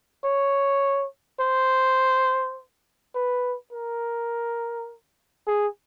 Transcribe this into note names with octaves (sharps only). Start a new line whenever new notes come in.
C#5
C5
B4
A#4
G#4